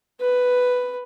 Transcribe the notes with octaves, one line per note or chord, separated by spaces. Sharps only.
B4